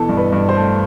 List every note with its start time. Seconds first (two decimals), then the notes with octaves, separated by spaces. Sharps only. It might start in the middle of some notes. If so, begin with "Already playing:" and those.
Already playing: B2 E3 A4
0.09 G2
0.17 B4
0.32 G2
0.49 C5
0.57 A3